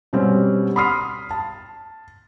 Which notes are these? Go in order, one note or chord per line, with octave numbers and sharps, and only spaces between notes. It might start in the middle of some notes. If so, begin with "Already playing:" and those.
B2 G3 C4 C#4
B5 C6 D#6 F6 C7
A5